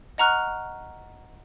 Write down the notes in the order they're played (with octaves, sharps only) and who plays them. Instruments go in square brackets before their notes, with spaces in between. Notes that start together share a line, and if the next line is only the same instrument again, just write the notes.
[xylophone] D#5 F#5 A#5 C#6 F6 F#6